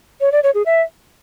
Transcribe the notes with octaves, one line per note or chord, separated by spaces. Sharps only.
C#5
D5
C#5
G#4
E5